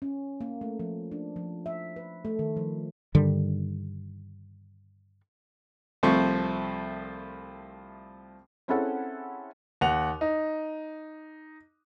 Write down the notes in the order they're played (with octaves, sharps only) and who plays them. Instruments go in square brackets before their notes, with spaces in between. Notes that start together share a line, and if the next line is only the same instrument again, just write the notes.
[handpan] C#4
A#3
A3
F3
D4
F3
E5
B4
A3
D#3
F3
[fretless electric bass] G2 D3 D#3 G3
[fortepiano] C2 F3 A3 C4 C#6
[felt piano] C4 C#4 E4 G#4 A4 F#5
[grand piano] D#2 F#5 F7
D#4